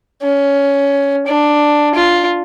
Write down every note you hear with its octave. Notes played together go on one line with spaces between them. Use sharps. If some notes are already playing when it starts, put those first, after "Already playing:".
C#4
D4
F4